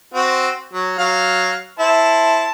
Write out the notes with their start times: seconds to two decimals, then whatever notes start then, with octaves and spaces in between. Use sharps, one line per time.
0.14 C4 F#4
0.73 F#3
0.98 F#3 F5
1.79 E4 C5 A5